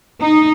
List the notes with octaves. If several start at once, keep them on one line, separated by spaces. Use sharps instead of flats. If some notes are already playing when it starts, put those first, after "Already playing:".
D#4